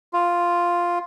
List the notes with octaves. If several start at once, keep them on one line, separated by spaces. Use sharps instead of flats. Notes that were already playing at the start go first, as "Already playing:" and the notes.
F4